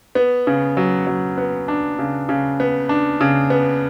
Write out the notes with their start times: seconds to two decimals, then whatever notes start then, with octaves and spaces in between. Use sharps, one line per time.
0.15 B3
0.47 C#3
0.77 F#3
1.07 F#3
1.38 B3
1.68 D4
1.99 C#3
2.29 C#3
2.60 B3
2.89 D4
3.21 C#3
3.50 B3